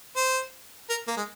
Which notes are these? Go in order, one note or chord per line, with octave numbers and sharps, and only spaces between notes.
C5
A#4
A#3
G#3